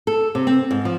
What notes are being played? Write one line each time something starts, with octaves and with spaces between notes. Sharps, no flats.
A4
C3
C4
G#2
F3